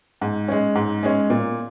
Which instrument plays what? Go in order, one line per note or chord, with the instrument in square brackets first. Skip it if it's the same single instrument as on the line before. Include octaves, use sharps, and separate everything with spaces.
[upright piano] G#2
G#3 C#4
G#2
G#3 C#4
A#2